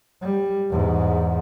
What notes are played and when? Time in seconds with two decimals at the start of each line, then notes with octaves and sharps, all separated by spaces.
0.22 G3
0.70 E2 G#2